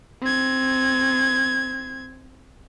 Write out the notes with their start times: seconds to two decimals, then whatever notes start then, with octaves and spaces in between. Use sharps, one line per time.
0.22 C4 G#6